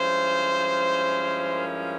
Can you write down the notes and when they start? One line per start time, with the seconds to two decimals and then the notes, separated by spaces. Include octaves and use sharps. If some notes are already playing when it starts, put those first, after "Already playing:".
Already playing: G2 F3 G#3 C#4 E4 C5
1.57 A#4